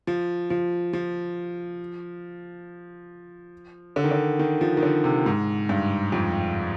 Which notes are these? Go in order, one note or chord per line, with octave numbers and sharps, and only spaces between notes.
F3
F3
F3
D3
D#3
D3
D#3
F3
D#3
D3
C3
G#2
G2
F2